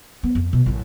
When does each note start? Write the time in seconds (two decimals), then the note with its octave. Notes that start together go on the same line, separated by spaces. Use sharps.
0.23 B3
0.35 F2
0.53 B2
0.66 A1 F#2